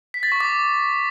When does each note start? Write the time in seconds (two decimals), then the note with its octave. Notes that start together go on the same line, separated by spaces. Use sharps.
0.14 B6
0.23 A6
0.32 C#6
0.40 D6